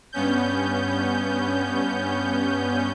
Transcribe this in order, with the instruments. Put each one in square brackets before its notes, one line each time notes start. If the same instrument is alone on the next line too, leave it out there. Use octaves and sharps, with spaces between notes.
[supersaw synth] G2 B3 C#4 G6